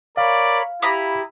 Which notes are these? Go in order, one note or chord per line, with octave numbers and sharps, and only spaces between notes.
A#4 C#5 D5 F5 B5
E4 G4 A#5 B5 D#6